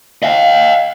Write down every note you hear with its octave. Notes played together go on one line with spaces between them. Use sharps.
D#5 F5